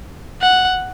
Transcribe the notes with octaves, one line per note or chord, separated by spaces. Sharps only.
F#5